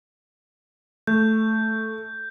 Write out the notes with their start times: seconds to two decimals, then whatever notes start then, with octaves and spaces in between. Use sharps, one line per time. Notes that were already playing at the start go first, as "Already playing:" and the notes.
1.07 A3 G6